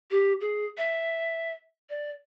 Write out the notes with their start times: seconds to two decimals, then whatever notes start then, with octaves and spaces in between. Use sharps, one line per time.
0.11 G4
0.41 G#4
0.78 E5
1.90 D5